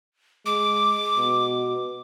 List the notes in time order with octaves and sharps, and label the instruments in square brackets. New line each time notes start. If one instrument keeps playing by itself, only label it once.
[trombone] G#3 [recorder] D6
[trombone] B2